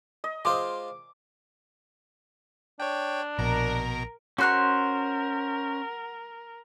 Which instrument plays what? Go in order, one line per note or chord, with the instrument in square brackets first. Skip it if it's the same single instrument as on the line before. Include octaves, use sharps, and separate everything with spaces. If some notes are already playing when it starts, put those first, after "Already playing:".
[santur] D#5
[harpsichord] G#3 F4 C5 [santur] D6
[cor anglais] D4 [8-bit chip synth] C#5 G5
[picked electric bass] A#1 [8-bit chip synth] B2 A#5 [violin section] A#4
[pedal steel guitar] C#4 C5 F#6 [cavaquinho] F#4 C6 C#6 [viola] A#4